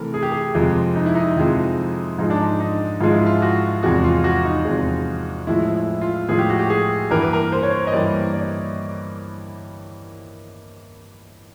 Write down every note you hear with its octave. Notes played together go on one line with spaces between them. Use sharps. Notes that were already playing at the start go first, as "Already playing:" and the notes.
Already playing: C3 E3 A3 A#4
G#4
G4
G#4
F2 C3 F3 G#3
D#4
E4
D#4
F2 C3 F3 G#3
G#2 F3 G#3 D#4
D4
D#4
D#4
G#2 F3 G#3 F4
E4
F4
F#4
E2 C3 F3 G#3 F#4
F4
F#4
D#4
E2 C3 F3 G#3
A2 F3 G#3 E4
E4
F4
A2 F3 G#3 G#4
G4
F#4
G4
G#4
G2 E3 G3 A#3 A#4
B4
A#4
C5
C#5
C5
D#5
G2 E3 G3 A#3 D5
D5